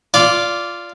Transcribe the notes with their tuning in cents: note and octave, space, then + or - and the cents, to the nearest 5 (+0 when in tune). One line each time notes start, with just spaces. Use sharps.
F4 -10 D5 -10